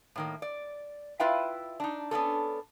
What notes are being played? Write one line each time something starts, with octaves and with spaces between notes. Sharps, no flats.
A2 D#3 A#3
D5
E4 F4 B4 E5 F5 G5
D4 D#4
B3 C#4 D4 F4 G#4 A4